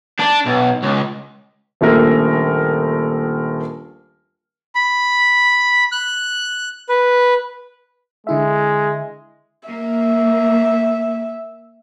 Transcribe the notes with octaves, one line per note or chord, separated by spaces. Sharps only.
D4
B1
C#2
D#1 A#1 A3 A#4
B5
F#6
B4
D3 G#3 E4 E5
A#3 E5